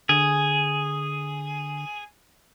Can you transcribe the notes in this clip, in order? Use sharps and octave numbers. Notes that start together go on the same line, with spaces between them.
D3 G#4